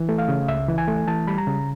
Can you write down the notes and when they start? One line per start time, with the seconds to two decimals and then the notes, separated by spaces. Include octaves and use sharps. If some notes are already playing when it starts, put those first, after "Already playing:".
Already playing: E3
0.09 A3
0.18 F5
0.29 C#3
0.48 C#2 E5
0.68 E3
0.78 G#5
0.88 A3
1.08 E3 A5
1.28 G3 B5
1.38 A#5
1.47 C#3